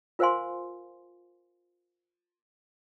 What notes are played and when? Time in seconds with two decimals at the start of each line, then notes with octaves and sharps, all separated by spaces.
0.19 F4 A#4 C5 F5 G#5 C6